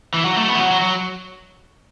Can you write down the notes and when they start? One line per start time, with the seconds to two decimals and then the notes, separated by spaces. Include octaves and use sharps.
0.14 E3
0.25 F#3
0.37 A3
0.49 B3
0.56 E3
0.59 F#3
0.71 F#3
0.81 F#3